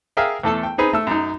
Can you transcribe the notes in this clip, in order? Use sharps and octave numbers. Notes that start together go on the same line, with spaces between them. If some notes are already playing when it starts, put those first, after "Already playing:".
G#4 A#4 E5 F5 G5
E2 A3 A4 A5
G5
C4 D#4 G#4 B4
A3 E6
F#2 D#4